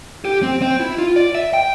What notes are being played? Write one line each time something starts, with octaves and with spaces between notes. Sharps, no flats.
G4
C4
C4
E4
F4
D5
E5
G5